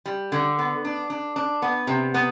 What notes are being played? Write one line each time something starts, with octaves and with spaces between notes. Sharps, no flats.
G3
D3
B3
D4
D4
D4
B3
C3
B3